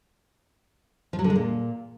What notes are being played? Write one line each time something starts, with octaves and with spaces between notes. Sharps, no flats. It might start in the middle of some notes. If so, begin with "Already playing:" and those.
F3
F#3
D3
G#3
A#2